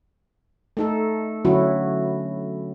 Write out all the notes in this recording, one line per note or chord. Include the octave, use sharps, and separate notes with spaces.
A3 D#4 A4
D3 F#3 C#4 E4 F#4